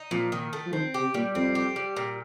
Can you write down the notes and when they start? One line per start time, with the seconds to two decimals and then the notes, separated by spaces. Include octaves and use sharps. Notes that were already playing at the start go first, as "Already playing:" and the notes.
Already playing: D#4
0.11 A#2 F3
0.32 D#3
0.53 A3
0.66 F3
0.73 D#3 C4
0.94 G4
1.00 C3
1.14 A#2 G3
1.35 F2 C4
1.55 G4
1.76 G3
1.97 A#2